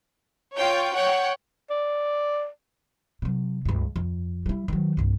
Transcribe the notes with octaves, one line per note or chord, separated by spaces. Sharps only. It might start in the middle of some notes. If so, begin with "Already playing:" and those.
F4 C#5 G5
C#5 F#5 G5
D5
C3 F#3
C#2 G2
F2
G3 E4
D#3 F#3
C2 G2